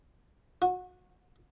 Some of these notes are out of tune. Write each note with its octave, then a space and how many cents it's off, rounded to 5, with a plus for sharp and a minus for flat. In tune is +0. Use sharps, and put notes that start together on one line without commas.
F#4 -30